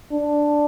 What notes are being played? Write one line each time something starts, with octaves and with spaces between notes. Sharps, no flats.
D4